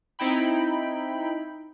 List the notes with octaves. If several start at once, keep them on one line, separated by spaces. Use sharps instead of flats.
C4 D#4 E4 G5 B5